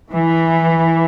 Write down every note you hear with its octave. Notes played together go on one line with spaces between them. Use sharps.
E3